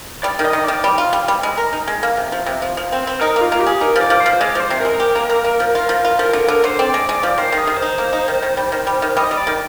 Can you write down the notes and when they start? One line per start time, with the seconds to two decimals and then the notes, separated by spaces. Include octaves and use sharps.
0.23 G3 D5
0.39 D#3
0.44 D#5
0.53 D#3
0.64 D#3 D5
0.84 G3
0.98 F4
1.13 G3
1.28 G3
1.43 G#3
1.58 A#4
1.73 D#4
1.88 G#3
2.03 A#3
2.17 C3
2.32 F3
2.46 C3
2.62 F3
2.77 F3
2.92 C4
3.07 C4
3.21 D#4 A#4
3.36 A#3
3.41 F4
3.52 A#3
3.61 G4
3.66 G#4
3.81 D#4 A#4
3.96 F3 D5
4.10 F3
4.20 C5
4.26 F3
4.33 C5
4.40 G#3 D5
4.55 F3 C5
4.70 C3
4.81 G#3 A#4
5.00 G4
5.15 A#3
5.30 A#3
5.44 A#3
5.60 F3
5.75 F4
5.89 F3
6.04 F4
6.19 F3 A#4
6.33 D3 A#4
6.48 D3 A#4
6.64 D3 C5
6.79 C4 D5
6.94 G#3
7.09 G#3
7.23 F3
7.38 D#3 C5
7.52 D#3
7.58 G#4
7.67 D#3
7.77 C5
7.82 D#4
7.98 A#3
8.13 D#4
8.28 D#3
8.42 D#3
8.57 G3
8.72 D#3
8.87 G3
9.02 D#3
9.17 G3 D#5
9.31 G3
9.37 D5
9.47 D#3